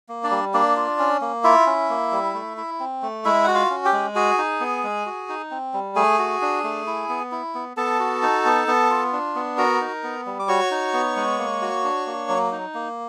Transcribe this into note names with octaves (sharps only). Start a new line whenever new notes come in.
A#3
D4 D5
G3
A#3 D4 D5
F4
C#4
A#3
E4 F4 E5
C#4
A#3
G3
A3
E4
C4
A3
G#3 E4 E5
F#4 F#5
F4 F5
C#4
G4 G5
G#3
F#4 G#4 G#5
D#4
B3
G#3
F#4
D#4
C4
G3
A3 G#4 G#5
F#4
D4
A3
E4
B3
E4
B3
B3 A4 A5
F#4
D#4
B3
B3
F4
D4
B3
F#4 A#4 A#5
D#4
B3
G3
D6
F#4 C#5 C#6
D#4
B3
G#3
A#3
F#4
D4
A#3
F#3
D#4
A#3